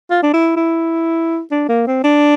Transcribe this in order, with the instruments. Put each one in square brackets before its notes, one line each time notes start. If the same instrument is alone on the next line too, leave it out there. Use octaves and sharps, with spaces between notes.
[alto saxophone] F4
D4
E4
E4
D4
A#3
C4
D4